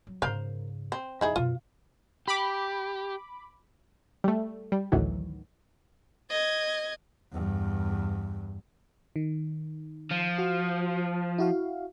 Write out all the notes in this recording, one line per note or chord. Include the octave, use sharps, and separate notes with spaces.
F#3
G#2 C#3 A#4 C5 F5
C4
E2 D#4 E4 G#4
F#2 B2 F4
G4 B5 D6
G3 A3
G3
A1 D2 A2 D#3 E3 F#3
D#5 G#6
E2 G2
D#3
F3
F#4
E4 F#4 F5